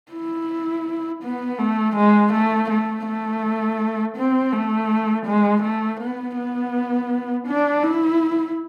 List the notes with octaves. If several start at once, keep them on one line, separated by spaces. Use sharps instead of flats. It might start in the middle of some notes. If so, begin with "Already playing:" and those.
E4
B3
A3
G#3
A3
A3
A3
C4
A3
G#3
A3
B3
B3
D4
E4